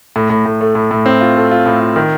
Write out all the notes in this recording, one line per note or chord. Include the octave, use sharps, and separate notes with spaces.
A2
A2
A2
A3
A2
A2
C4
F4
A3
F4
A2
F4
D#3